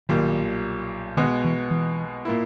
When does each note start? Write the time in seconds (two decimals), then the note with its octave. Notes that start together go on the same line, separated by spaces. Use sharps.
0.09 B1 A#2 D#3 G3
1.17 B2 D#3 G#3 B3
1.44 E3
1.71 E3
2.25 A#2 A#3 E4